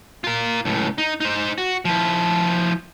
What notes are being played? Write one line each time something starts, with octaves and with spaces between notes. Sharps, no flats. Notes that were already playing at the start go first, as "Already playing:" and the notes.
F4 A#4
C#2 A2
D#4
D#4 C5
F#4
F3 E4